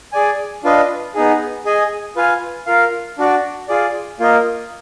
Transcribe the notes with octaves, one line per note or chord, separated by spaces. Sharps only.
G#4 D5 G#5
D4 F4 B4 D#5
B3 D#4 G#4
G#4 D#5 G#5
F4 B4 F5 G#5
F4 A#4 F5
D4 F#4 D5
F4 G#4 D5
A#3 F4 A#4 D#5